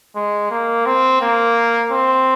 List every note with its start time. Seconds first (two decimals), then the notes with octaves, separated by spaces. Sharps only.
0.16 G#3
0.51 A#3
0.86 C4
1.21 A#3
1.91 C4